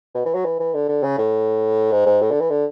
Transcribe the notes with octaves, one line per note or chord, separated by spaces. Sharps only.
B2
E3
F#3
E3
E3
D3
D3
C#3
A2
G#2
G#2
A2
D3
E3
D3